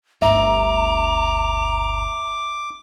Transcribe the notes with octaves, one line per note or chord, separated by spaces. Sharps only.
G1 D2 E5 A#5 D6